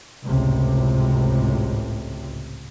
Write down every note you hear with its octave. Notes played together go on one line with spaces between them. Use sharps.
G#1 C#2 A2 C3